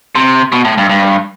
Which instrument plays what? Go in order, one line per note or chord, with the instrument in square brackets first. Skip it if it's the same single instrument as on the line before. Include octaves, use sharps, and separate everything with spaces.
[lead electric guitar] C3
B2
A2
G2
G2